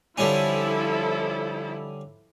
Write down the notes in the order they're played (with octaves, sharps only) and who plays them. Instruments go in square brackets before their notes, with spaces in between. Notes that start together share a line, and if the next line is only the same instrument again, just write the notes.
[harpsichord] D3 G3 C#4 [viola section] F3 E4 A4